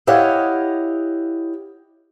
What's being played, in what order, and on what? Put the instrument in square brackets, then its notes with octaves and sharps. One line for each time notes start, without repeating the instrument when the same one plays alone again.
[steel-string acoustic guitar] E4 G4 C#5 D#5 F5 F#5